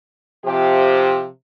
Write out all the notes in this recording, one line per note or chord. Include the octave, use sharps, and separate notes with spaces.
C3 F3 G4